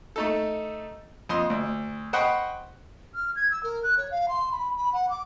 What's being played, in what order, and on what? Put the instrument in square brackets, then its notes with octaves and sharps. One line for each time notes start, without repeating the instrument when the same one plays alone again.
[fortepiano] A3 D#4 A4
F2 D#5 C6
D2
C5 D#5 F#5 G5 B5 C#6
[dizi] F6
G#6
E6
A#4
F#6
C#5
F5
C6
B5
B5
F#5
D6